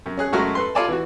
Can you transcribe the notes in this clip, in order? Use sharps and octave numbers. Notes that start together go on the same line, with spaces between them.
F#2
C#4 G#4 F#6
F#2 G#3 A3 F#4 A#5 F6
A4 B4 C6
F4 A4 D5 G#5 A5 B5
E3 F#4